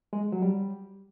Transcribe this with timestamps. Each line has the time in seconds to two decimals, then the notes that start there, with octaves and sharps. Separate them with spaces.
0.13 G#3
0.32 F#3
0.42 G3